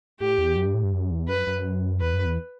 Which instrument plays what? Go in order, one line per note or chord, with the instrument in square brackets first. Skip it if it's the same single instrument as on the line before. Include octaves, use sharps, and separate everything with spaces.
[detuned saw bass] A2 [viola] G4
[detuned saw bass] E2
F#2
G2
A2
G2
F#2
E2
[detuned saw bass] F#2 [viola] B4
[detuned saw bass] F#2
[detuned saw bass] E2 [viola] B4
[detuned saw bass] F#2
E2